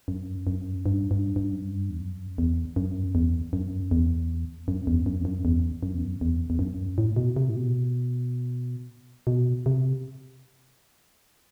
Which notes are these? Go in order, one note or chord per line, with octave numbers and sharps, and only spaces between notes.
F#2
F#2
G2
G2
G2
F#2
G2
E2
F#2
E2
F#2
E2
F#2
E2
F#2
E2
F#2
E2
F#2
E2
F#2
E2
F#2
E2
E2
F#2
A2
B2
C3
A2
B2
B2
C3